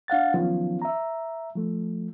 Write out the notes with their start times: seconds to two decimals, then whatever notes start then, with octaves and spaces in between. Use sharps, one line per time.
0.08 D4 F5 F#5 A6
0.34 D#3 F3 F#3 B3 C#4 F4
0.82 E5 A#5
1.55 F3 A3